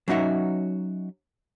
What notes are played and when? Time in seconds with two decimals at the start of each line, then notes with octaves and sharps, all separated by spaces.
0.08 F#3 C#4 D#4 F#4 E5